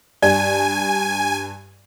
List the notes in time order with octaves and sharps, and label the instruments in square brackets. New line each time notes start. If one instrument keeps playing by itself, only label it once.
[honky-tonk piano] G2 [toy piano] D5 [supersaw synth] G#5